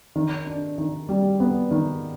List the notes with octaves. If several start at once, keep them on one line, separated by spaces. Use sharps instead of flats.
D#3
D4
D#3
G3
B3
D#3